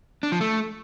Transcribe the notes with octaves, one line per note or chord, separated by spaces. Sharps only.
D4
F3
A3